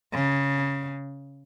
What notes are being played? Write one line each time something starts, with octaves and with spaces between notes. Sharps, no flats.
C#3